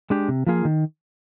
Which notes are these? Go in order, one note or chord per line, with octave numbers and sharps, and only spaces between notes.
G#3 D4 G4
C3
F3 A#3 F4 G#4
D#3